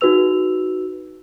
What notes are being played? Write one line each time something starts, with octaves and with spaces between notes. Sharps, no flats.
D#4 F#4 G#4 B4 E6 F7